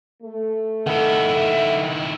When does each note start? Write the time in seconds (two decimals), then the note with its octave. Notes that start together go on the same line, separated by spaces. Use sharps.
0.22 A3
0.87 D#3 E4 A4 E5 F#5